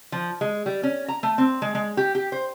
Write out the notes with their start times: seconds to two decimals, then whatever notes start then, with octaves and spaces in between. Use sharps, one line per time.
0.12 F3
0.41 G#3
0.66 G3
0.83 C#4
1.08 A#5
1.23 A3
1.38 C4
1.62 G#3
1.75 G#3
1.97 G4
2.15 G4
2.32 C5